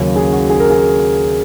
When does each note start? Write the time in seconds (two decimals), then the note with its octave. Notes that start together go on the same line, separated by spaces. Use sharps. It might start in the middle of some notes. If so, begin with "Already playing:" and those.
Already playing: D#2 C#3 F#3 C#4
0.16 G#4
0.33 F#4
0.50 G#4
0.60 A#4
0.70 G#4